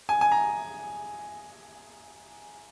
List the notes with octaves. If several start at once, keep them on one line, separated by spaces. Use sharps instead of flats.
G#5
G#5
A#5